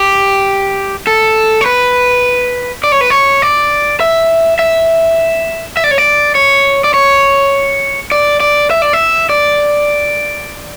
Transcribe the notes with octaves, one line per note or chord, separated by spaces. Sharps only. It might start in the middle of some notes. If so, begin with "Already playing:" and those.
Already playing: G4
A4
C#5
B4
D5
C#5
B4
C#5
D5
E5
E5
E5
D5
C#5
D5
C#5
D5
C#5
D5
D5
E5
D5
E5
D5